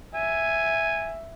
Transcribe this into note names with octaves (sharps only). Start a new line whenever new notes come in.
E5 G#5